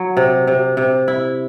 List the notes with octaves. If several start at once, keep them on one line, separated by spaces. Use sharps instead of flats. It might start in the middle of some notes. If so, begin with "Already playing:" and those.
Already playing: F#3
C3
C3
C3
E4